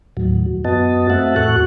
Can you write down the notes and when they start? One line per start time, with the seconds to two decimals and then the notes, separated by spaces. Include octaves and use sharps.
0.17 D#2 A2 F#3
0.65 F#2 B3 F#4 D#5 A5
1.10 A3 C4 F#4 E5 F#5 A5
1.36 E2 A2 F#4 A4 C#6 F#6